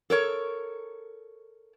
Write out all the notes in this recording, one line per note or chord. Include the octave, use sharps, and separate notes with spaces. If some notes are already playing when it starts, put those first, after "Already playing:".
A4 A#4 C#5